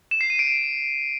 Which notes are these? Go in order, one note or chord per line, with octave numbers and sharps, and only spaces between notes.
E7
C7
D#7
D7